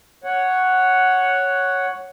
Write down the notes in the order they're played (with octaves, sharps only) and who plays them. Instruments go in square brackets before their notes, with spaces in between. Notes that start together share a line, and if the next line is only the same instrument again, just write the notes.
[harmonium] C#5 F#5